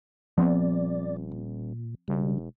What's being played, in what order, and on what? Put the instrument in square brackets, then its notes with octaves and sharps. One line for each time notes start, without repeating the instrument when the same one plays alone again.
[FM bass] D#1 [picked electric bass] F3 B3 C4 [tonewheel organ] D5
[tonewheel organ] A#2
[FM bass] E1 [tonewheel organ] C#3 G3